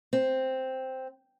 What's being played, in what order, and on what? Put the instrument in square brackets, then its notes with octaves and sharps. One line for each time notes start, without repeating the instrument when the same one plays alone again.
[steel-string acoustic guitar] C4